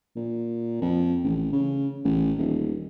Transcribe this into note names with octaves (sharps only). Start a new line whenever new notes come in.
A#2
F2
A1
C#3
A1
D#1